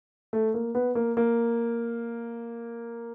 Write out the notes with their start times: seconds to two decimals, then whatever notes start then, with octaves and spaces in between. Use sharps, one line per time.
0.33 A3
0.54 A#3
0.75 B3
0.95 A#3
1.17 A#3